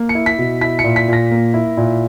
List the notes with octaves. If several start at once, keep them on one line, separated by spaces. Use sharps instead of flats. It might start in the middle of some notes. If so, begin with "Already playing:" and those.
Already playing: A#3
C#7
E4
B6
B2
E4 B6
C#7
A#2
B6
A#2 A#6
A#3
E4
A#2